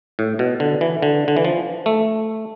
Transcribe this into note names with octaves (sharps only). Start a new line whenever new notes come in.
A2
B2
D3
E3
D3
D3
E3
F3
A3